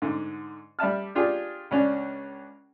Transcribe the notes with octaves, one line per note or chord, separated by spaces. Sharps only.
G#2 D3
G3 D5 E5 A5 F6
D4 F4 G4 G#4
C#2 C#4 D4